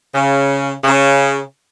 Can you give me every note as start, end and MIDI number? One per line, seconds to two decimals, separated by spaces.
0.14 0.73 49
0.84 1.40 49